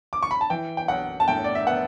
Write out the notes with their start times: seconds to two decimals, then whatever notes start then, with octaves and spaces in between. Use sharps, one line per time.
0.13 D6
0.23 C#6
0.31 B5
0.41 A5
0.50 E3 G5
0.77 G5
0.88 B1 F#5
1.20 A5
1.28 A2 G5
1.44 D5
1.55 E5
1.67 B3 F#5